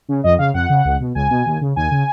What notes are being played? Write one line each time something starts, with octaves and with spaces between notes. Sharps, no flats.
C#3
F2 D#5
C#3 F5
F2 F#5
C#3
C#2
B2
C#2 G#5
B2
D#2
C#3
D#2 G#5
C#3